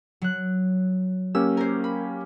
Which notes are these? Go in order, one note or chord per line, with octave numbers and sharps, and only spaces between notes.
F#3 F#6
A#3 C#4 G4 E6
A#4 C5
B5